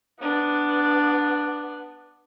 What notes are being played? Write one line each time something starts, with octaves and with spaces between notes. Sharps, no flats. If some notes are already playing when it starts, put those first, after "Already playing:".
B3 D4